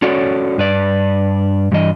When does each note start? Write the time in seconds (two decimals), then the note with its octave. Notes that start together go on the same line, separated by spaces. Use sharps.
0.02 C#4 F#4 A4 C#5 D5
0.58 G2 B4 D5
1.72 G2 E3 D#5